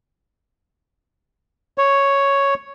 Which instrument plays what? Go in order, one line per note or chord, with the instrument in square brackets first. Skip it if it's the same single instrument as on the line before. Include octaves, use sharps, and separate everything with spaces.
[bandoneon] C#5